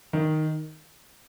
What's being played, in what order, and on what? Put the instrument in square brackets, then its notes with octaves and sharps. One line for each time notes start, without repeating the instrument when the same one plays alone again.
[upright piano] D#3